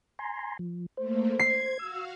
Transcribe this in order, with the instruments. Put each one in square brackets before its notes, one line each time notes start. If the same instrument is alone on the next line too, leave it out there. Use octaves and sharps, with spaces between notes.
[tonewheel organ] G#5 A#5 C6
F3
[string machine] A3 A#3 [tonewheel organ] C5
[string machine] G#6 [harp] C7
[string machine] F#4 F5 [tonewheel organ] E6